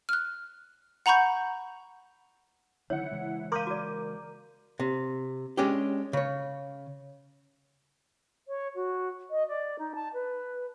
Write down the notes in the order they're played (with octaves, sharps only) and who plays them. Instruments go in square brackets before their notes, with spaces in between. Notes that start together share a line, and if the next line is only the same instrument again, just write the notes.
[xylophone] F6 F#6
F#5 A#5 B5 C#6 G6
[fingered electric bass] D3 D#3 F#3 [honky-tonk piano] E4 F#5 [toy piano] C#5
[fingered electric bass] C#3 E3 G#3
[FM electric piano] A#4 [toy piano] F5 C6 [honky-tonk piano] D6 G6 D#7
[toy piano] F#4 D5
[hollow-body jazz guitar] C3
G#3 C#4 D4 G4
C#3 C#5
[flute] C#5
F#4
D#5
D5
D#4
A5
B4